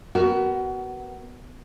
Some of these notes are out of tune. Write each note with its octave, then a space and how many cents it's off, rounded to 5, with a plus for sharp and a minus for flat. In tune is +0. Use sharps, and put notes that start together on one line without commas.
B3 +0 F#4 +25 A#4 +0